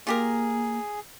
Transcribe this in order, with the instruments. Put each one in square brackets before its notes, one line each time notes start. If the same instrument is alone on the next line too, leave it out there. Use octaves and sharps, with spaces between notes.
[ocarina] A#3 [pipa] F4 G4 A#4 [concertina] G#4